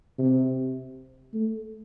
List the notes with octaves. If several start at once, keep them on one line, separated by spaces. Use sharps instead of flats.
C3
A3